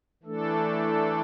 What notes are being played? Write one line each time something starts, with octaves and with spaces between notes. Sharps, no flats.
E3 A3 D4 A4